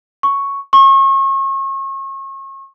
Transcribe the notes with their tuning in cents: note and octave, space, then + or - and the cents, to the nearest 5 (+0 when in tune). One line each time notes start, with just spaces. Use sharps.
C#6 +0
C#6 -35